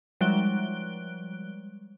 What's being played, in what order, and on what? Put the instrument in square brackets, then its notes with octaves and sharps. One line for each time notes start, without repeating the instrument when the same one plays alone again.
[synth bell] F3 G3 G#3 F#6 D7 G7